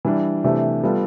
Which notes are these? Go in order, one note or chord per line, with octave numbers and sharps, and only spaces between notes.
E3 G3 D4
C3 E3 A3 D4 G4
G3 B3 F4 A4